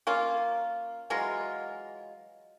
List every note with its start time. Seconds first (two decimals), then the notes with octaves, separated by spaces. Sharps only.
0.07 A#3 C#4 F4
1.10 E3 F#3 G#3 F4